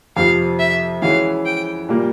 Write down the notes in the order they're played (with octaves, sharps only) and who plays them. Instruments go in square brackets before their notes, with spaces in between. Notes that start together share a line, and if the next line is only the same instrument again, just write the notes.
[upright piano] F2 C3 F3 [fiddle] F5
[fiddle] E5
[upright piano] E3 G#3 C#4 F#4 [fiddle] F5
[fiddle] G5
[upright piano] A#2 G3 A#3